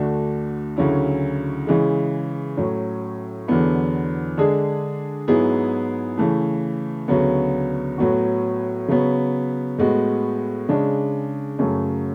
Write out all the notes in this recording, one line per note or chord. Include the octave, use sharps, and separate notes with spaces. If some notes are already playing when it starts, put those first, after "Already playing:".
Already playing: D2 D3 A3 D4 F#4
D2 C#3 F#3 C#4 E4
C#3 E3 G#3
A2 F#3 C#4
E2 D3 F#3 B3 E4
D3 G#3 D4 G#4
G#2 F#3 B3 E4 G#4
C#3 E3 A3
D2 C#3 F#3 B3
A2 F#3 B3 F#4
C#3 F#3 B3
A2 G#3 B3 F#4
C#3 G#3 D4
F#2 C#3 F#3 A3